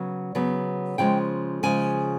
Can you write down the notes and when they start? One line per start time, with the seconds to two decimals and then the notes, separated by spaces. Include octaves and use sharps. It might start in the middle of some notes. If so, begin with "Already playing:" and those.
Already playing: C#3 F#3 B3
0.35 C#3 F#3 B3
0.98 C#3 F3 G#3 G5
1.63 C#3 F3 G#3 G#5